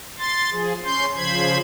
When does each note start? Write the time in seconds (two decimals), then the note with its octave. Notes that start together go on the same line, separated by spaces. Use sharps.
0.18 C6 A6
0.52 F3 G#4
0.85 C#4 C6 G6
1.16 C#3 F3 C5 B5 G#6